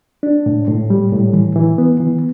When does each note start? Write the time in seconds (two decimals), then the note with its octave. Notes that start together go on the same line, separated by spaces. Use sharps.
0.23 D4
0.46 A2
0.68 A2
0.90 G3
1.12 A2
1.33 E3
1.55 E3
1.78 B3
2.00 E3